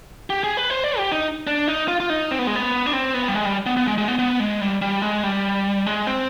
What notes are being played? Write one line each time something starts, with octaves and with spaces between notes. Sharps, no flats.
G4
G#4
B4
C5
D5
G4
D#4
D4
D#4
F4
F4
D#4
C4
B3
G#3
B3
D4
C4
B3
G3
G#3
G3
B3
B3
G#3
G#3
B3
B3
G#3
G3
G3
G#3
G3
G#3
C4